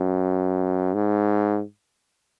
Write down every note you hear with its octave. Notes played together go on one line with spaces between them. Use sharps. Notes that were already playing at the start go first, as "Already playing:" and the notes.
Already playing: F#2
G#2